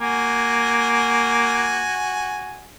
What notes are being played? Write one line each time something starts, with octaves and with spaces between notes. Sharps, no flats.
A#3 F#4 G#5